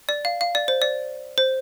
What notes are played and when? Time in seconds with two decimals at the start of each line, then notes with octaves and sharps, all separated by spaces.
0.09 D5
0.25 F5
0.41 F5
0.55 D5
0.68 C5
0.82 D5
1.38 C5